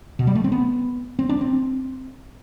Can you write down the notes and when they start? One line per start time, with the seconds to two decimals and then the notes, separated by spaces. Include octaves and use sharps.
0.19 B2
0.27 G3
0.35 A3
0.44 C4
0.52 B3
1.19 C4
1.29 D4
1.41 C4